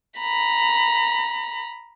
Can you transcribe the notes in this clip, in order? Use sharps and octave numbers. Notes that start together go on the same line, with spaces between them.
A#5 B5